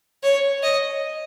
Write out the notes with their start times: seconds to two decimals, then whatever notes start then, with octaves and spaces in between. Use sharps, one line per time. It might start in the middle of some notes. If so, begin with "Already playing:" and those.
0.23 C#5
0.63 D#5